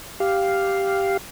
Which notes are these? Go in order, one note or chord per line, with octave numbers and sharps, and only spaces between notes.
G4 F5